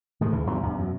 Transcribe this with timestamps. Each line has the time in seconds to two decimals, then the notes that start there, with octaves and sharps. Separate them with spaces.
0.21 A2 D#3 G#3
0.33 D2 C#3 E3
0.47 E2 G2 B2 F3
0.63 E2 G2
0.78 F#2 B2